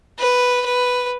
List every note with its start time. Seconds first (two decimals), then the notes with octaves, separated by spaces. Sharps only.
0.19 B4
0.66 B4